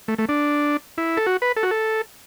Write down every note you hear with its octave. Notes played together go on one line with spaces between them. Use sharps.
A3
A3
D4
E4
A4
F#4
B4
A4
F#4
A4